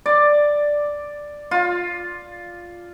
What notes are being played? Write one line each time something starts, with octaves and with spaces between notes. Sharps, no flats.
D5
F4